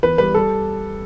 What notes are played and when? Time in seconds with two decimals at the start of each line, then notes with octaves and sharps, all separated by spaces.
0.03 E2 B4
0.18 G3 B4
0.34 G3 A4